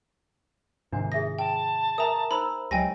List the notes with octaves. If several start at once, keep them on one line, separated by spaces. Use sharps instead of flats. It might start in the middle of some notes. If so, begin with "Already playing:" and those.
G#2 C3 D#3 D4 F#4 G#5
G#4 E5 D#6 A#6
G5 A5
A#4 E5 G#5 A#5 D#6
D#4 C5 A#5 B5 E6
C#2 F#3 G4 C#5 D#5 G5 G#5 A#6